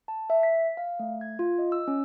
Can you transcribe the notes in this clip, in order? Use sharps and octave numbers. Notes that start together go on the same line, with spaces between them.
A5
E5
B6
F5
A3
G#6
F4
D#5
E6
C#4